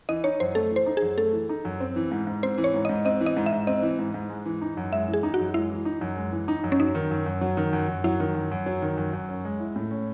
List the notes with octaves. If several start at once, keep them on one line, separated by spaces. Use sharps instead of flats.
E3 D#5
D#4 C#5
F#2 C5
A3 A4
E3 C5
D#4
G#4
F#2
A3 A4
E3
D#4
F#2
C4
E3
G#2
G#2
C4 C5
E3
C#5
G#2
D#5
G#2
C4 D#5
E3
D#5
G#2
E5
G#2
C4 D#5
E3
G#2
G#2
G#3
E3
D#4
F#2
G#3 E5
E3
G#4
D#4
F#4
F#2
G#3 E4
E3
D#4
F#2
G#3
E3
D#4
F#2
C#4
F#3 D#4
D#3
F#2
F#2
F#3
D#3
F#2
F#2
F#3 E4
D#3
F#2
F#2
F#3
D#3
F#2
F#2
C#4
G#3
E4
A2
C#4